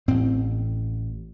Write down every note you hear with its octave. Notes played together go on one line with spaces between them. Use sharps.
A1 A2 C4